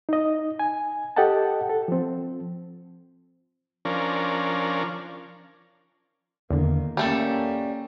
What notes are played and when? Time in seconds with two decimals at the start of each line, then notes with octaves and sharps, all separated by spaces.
0.09 D#4 D#5
0.59 G#5
1.16 G4 A4 D#5 F#5 G5 A5
1.69 A4
1.88 F3 C4
3.85 F3 C#4 D4 A#4
6.51 E2 D3 D#3 A#3
6.97 G3 A3 A#3 C#4 A4